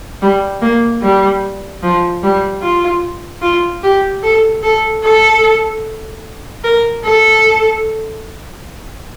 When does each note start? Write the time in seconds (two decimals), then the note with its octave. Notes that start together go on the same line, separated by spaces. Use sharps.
0.22 G3
0.62 A#3
1.02 G3
1.83 F3
2.23 G3
2.62 F4
3.42 F4
3.83 G4
4.23 A4
4.63 A4
5.04 A4
6.64 A#4
7.04 A4